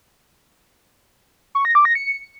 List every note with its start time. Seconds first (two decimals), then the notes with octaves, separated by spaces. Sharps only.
1.55 C#6
1.65 A#6
1.75 D6
1.85 A#6
1.95 C#7